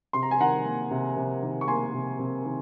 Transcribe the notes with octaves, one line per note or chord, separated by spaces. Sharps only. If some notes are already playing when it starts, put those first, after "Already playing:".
C3 C6
A#5
G#5
D#3 F#5 A#5
A#3
C3
C3
D#3
C#6
A#3 G#5 C6
C3
C3
D#3